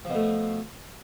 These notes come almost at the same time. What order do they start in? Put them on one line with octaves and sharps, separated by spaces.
F3 B2 A3